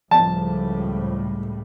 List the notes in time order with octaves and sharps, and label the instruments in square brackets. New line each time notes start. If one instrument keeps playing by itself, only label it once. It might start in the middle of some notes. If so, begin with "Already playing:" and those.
[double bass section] C#2 A2 G3 [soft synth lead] F3 [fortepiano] A5